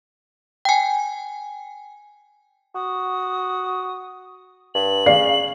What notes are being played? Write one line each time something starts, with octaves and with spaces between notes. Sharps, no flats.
G5 G#5
F#4 D#6
G2 F#7
C#3 D5 F5 C7